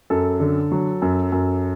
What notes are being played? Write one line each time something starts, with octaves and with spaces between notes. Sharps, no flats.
F#2 A4
D3
F#3
F#2
F#2